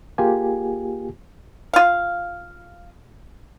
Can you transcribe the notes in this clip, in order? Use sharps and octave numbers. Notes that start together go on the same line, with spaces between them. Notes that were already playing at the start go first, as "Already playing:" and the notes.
A#3 F4 G4 G#4 G#5
F4 F5